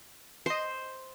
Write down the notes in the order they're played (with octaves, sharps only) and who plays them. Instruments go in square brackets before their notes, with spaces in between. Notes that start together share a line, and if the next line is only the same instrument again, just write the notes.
[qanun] C5 [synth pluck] D#5 C7